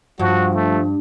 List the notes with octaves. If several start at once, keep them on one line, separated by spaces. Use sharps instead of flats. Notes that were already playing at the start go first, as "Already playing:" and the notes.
G2 F3 F#4
A3